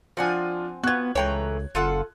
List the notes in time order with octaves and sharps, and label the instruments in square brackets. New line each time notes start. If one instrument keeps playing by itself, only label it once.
[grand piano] F3 D4 F4 [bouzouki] C4 F#5 G#5
[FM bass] B3 [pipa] F4 F#4 [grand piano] F#6 G#6
[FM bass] C#2 [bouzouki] A2 E3 A#5 [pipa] C#5 G5
[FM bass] F#1 [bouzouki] F4 A4 F#5